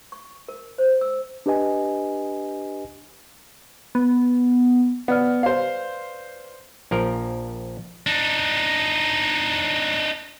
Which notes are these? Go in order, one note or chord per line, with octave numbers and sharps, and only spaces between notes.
C#6
A#4
C5
E6
D4 G4 B4 D#5 G#5
B3
B3 B4 D5 F6
C5 F5
A#1 F3 A#4
D4 D#4